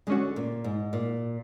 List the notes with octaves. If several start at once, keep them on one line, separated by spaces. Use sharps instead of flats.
D3 G#3 C#4 F#4
A#2
G#2
A#2